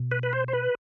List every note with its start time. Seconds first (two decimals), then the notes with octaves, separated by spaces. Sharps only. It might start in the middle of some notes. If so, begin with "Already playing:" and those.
Already playing: B2
0.11 B4
0.23 B4
0.33 C5
0.48 C5
0.53 B4